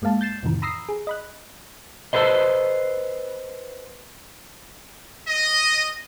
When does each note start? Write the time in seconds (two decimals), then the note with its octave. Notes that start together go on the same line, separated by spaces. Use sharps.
0.02 G2 G#3 A#3 F5 A5
0.21 G6 A6 C7 E7
0.43 F2 A2 C3 D#3 E3
0.62 A#5 B5 D#6 E6 A#6 C7
0.89 G#4
1.07 D#5 B5 F#6
2.13 A4 B4 C5 D#5
5.27 D#5